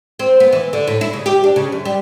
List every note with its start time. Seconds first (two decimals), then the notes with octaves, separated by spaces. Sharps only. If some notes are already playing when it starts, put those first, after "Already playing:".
0.19 C4
0.40 B3
0.53 E3
0.73 D3
0.88 A2
1.01 E4
1.13 C#3
1.26 G4
1.44 D4
1.56 C#3
1.72 F#2
1.85 G3